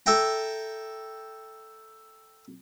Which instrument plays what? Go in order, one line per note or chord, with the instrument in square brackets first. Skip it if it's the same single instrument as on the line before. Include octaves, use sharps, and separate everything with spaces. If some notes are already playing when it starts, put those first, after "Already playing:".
[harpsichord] A4 E5 G5 A#5